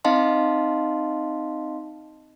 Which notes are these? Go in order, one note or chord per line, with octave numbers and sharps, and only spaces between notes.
C4 D#4 D#5 F5 A5 C6